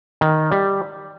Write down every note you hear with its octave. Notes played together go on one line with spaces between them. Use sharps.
D#3
G3